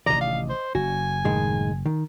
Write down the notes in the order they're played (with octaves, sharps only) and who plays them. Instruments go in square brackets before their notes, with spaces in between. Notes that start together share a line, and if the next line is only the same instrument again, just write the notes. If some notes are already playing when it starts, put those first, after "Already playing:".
[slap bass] A1 C3 D#3 [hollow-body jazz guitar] D5 D#5 [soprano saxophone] A#5
[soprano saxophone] F5
C5
[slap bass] F#1 [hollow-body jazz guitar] F#4 [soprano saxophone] G#5
[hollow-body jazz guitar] A2 D#3 G#3
D#3